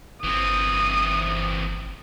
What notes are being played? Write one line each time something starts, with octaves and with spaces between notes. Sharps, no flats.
G1 E3 C4 D#6